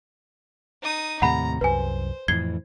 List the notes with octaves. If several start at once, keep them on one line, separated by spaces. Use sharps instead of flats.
D#4 D#6
D#2 A2 C3 F#5 A#5 B5
C2 F#2 B4 C5 G#5
F2 A2 E3 G#6 C7 G7